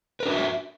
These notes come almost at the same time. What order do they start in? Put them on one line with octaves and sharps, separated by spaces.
B4 A#4 D4 F#4 E5